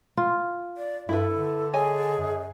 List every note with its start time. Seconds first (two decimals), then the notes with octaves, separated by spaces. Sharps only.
0.17 F4
0.77 D5
1.09 G2 E4 A4 B4
1.34 D3
1.73 G#4 C#5 D#5 G#5
2.19 F#2